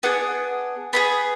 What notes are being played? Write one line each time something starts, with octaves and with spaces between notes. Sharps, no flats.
B3 D4 G#4 F#5
B3 D4 G#4 B5